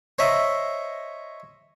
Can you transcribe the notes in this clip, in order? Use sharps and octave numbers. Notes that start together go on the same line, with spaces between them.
C5 C#5 D#5 E5 A#5